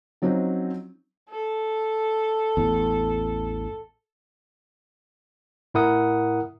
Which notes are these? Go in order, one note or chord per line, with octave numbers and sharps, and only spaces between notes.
F3 F#3 C4 C#4 D#4
A4
A1 E2
A2 E4 A#4 F#5 D#6